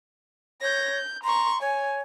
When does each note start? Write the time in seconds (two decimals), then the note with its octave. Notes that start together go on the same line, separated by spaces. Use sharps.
0.61 C#5 G6 A#6
0.90 G6
1.24 A#5 C6 C#6
1.61 C#5 G#5